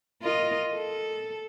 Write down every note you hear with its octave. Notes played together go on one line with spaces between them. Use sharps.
F4 A#4 D#5
A4